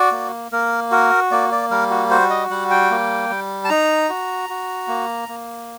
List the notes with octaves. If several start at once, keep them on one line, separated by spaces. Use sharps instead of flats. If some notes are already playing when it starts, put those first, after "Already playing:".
Already playing: F#4 D5
A#3
A#3 A#4
F#4 A#4
A#3 D5
D5
G3 A#4
F#4
F#4 C5
D#5
G3 F#5
G5
A#3
G3
A5
D#4 A#5
F#4
F#4
A#3
A#3